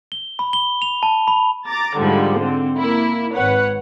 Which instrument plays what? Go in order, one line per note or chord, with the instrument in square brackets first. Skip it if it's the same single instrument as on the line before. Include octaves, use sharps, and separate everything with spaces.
[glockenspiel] G7
B5
G7
F7
A5
B5
[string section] A#5 D6 A6
G#2 D3 F3 G3
D3 C4
A#3 E4
G#1 B4 C#5 F#5